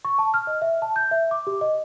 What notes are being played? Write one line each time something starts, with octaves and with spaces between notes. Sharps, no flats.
C#6
A5
F6
D#5
E5
A5
G6
E5
D6
G4
D#5